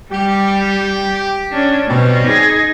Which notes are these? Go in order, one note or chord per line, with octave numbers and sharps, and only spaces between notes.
G3 G4
C#4 D4
B2 G3 C4 C#4
D#4 G#4